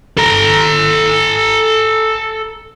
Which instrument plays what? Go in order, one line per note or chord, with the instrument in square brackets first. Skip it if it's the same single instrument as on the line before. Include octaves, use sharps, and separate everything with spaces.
[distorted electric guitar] A4 A#5